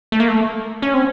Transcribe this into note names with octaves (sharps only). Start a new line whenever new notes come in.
A3
A#3
A3
C#4
C4